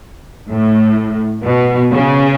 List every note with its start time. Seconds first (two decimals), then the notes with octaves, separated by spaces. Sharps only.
0.49 A2
1.44 B2
1.92 C#3